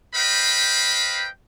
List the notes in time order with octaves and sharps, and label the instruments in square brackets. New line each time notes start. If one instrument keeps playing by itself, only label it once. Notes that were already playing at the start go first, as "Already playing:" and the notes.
[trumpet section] B4 C5 D#5 F5 G5 B5